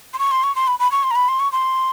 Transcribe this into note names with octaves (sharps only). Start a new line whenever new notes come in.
C6
C#6
C6
C#6
C6
B5
B5
C#6
C6
A#5
B5
C6
C#6
C6